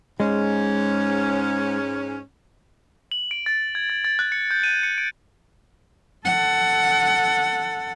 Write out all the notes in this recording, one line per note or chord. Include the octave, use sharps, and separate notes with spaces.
G#2 G#3 C#4
F#7
D7
A6
G#6
A6
A6
F#6
C#7
G6
D#7
C#7
D7
A4 F#5